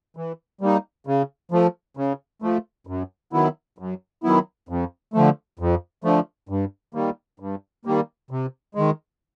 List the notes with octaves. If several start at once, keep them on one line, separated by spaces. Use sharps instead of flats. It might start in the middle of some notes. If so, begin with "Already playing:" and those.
E3
G3 A#3 D#4
C#3
F3 A3
C#3
F3 A3
F#2
D#3 F#3 B3 E4
F#2
D#3 F#3 B3 E4
F2
D3 F3 A3
F2
D3 F3 A3
G2
D#3 G3 A#3
G2
D#3 G3 A#3
C3
D#3 G#3